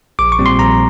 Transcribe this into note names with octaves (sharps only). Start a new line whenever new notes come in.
A#1 D6
C#6
A#2 G3 C4
C6
A#1 A#5